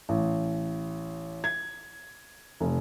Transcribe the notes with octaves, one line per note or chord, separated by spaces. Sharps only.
A1
G#6
F1